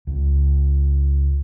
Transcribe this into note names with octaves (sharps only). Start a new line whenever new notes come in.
C#2